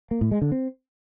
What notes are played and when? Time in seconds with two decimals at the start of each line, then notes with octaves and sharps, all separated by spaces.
0.11 A#3
0.21 A2
0.31 G#3
0.42 D3
0.52 C4